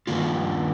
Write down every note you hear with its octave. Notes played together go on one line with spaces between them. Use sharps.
G2 D#3 A#3 F4